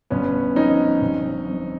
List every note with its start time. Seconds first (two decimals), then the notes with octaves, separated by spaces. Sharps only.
0.10 G1 B3 C#4
0.55 F2 C#4 D#4
1.02 G1
1.46 F2